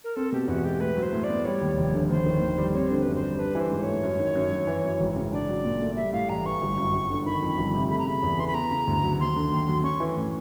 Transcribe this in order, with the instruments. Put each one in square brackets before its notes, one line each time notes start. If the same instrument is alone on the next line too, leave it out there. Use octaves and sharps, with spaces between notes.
[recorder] A#4
[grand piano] C4 [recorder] A4
[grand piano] B2 [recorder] G4
[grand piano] E2 [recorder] F#4
[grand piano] G#3 [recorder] G4
[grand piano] A2 [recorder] B4
[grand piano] F#3
[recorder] C5
[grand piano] A2
[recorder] D5
[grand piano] B3
[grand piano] G3 [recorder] C#5
[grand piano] D#2
F1
D3
[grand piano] D#2 [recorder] C5
[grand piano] D#3
D#2
G3
[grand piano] C4 [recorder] C#5
[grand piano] D3 [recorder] C5
[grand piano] F#2 [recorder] B4
[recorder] C5
[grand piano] G3
[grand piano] D4 [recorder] B4
[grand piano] E3 [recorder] C5
[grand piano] G#2
[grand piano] A3 [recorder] C#5
[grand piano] F#2
D#3
F#2
F#3
E3
F#2
G#1
C#3
[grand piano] D4 [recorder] D5
[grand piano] F#3
A#2
A3
[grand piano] G3 [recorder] E5
[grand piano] A2 [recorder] F5
[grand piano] A1 [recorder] A#5
[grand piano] E3 [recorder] C#6
[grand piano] G1
F#2
G1
D3
[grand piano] D#3 [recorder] B5
[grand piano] F2
G1
C3
[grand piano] A3 [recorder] B5
[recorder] A#5
[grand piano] C#3 [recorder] B5
[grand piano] E2
[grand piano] E3 [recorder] C6
[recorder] B5
[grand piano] B3 [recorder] A#5
[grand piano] C#3
D2
F#3
[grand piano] D#2 [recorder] C6
[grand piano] D3
D#2
F#3
[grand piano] C#4 [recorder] C#6
[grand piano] E3
A2